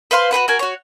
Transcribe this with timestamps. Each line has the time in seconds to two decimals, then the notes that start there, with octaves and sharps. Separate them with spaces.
0.11 B4 C5 F5 C6
0.31 F#4 G4 B4 F#5
0.48 F#4 A#4 G#5
0.59 F#4 C#5